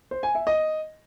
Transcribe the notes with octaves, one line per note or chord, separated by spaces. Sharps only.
C5
G#5
E5
D#5